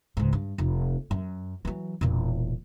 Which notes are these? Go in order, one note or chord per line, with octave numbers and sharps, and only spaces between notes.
C#2 G#2
G2
F1
F#2
E3 F#3
E1 A#2